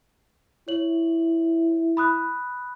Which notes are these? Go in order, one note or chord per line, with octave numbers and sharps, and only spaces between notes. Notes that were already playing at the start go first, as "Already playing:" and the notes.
E4 C#5 F#7
B5 D#6 F#6